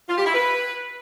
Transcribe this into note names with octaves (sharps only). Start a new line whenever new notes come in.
F4
G4
E4
B4